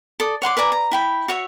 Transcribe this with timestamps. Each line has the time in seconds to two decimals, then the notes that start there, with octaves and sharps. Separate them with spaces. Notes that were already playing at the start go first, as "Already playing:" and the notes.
0.20 A4 D5 D#6
0.42 C#5 F#5 C6 D6
0.57 B4 D5 G#5 A#5
0.72 A#5
0.92 E4 G5 B5
1.28 F#4 C#5 E5